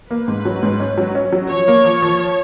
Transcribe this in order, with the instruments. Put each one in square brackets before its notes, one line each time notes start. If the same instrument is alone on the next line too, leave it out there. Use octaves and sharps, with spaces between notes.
[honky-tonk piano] A#3 [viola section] B4
[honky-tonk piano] G#2
F#3
G#2
C#4
F#3
C#4
F#3
[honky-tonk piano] F3 [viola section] C#5
[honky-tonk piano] A#3
F3
F3